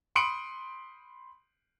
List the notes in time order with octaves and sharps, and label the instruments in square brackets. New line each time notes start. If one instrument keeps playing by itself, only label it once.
[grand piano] B5 C6 D#6 C#7 D7 F#7